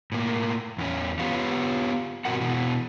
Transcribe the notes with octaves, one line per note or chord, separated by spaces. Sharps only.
A2 A#3
E2 C#4
B3 F4 G4 B4 C#5 F5
G2 B2 C4 F#4 A#4 F#5
B2 E3